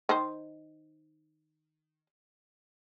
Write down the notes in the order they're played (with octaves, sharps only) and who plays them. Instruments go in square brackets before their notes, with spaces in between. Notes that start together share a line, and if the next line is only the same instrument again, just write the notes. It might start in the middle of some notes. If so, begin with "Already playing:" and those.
[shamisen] D#3 D#4 C5